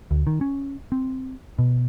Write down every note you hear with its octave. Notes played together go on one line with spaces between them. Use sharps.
D2
D#3
C#4
C4
B2